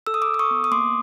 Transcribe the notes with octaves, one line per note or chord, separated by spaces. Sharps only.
A4 E6
D#6
D6 E6
A4
E6
C#6 D#6
B3
D#6
A#3 C6 D6